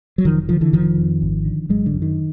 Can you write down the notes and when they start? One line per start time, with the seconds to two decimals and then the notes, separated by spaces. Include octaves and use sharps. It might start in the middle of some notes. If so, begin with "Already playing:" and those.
0.18 F#3
0.25 F1 D#3 F3
0.49 D3 D#3 F3
0.61 D3 E3
0.73 F1 D#3 F3
0.97 F2
1.22 G#1
1.45 D3
1.69 G#1 F#3 G#3
1.86 D3
1.94 F#2
2.02 D#3